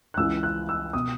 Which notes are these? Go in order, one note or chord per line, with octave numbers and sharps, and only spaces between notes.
F#6
C#2 C#3 E3 E6
F#6
E6
B2 D#6